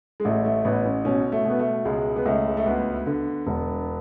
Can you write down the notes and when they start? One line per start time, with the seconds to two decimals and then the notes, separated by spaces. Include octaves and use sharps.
0.20 G#3
0.25 A1 A3
0.45 A3
0.65 A1 B3
0.85 C#4
1.05 B2 C#4
1.32 A3
1.45 B2 B3
1.59 A3
1.85 C#2 G#3
2.16 B3
2.25 C#2 A3
2.47 G#3
2.57 A3
2.66 D2 B3
3.06 D3
3.47 E1